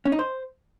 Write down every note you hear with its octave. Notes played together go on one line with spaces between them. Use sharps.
C#4
D#4
C5